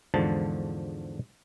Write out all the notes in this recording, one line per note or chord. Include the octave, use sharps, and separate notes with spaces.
E2 G#2 D3 F3 A5